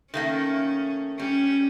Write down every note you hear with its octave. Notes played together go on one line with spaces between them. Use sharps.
D#3 A3 A#3 C#4
G3 C#4